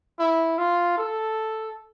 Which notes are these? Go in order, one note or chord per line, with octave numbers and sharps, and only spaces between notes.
E4
F4
A4